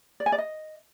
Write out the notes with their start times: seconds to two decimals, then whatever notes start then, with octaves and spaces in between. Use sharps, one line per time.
0.20 D5
0.26 G#5
0.32 D5
0.38 D#5